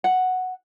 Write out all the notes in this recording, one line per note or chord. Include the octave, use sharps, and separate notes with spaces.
F#5